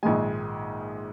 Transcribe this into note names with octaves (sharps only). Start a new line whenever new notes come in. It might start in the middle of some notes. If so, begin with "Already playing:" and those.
A#1 G#2 D#3 G#3 G#5